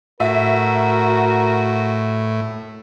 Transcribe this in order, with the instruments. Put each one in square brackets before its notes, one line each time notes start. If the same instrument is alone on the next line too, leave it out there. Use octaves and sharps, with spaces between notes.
[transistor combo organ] A2 [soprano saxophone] F#4 [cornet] A#4 [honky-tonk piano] E5